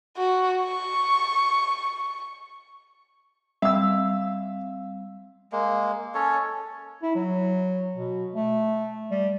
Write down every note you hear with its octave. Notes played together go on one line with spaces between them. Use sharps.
F#4
C#6
G3 C4 E5 F5 E6
G#3 A#3
C#4 A4 C#5
E4
F#3
B2
A3
G3